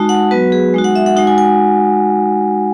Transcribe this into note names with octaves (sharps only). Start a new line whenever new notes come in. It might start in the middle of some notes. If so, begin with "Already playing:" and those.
Already playing: G#3 D#4 F#4 A5
F#5
F#3 B3 F#4 B4
G#4
G#3 D#4 F#4
F#5
E5
F#5
G#3 D#4 F#4 F#5
G#5
G#5